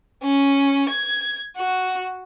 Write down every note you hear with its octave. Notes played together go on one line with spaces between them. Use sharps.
C#4
G#6
F#4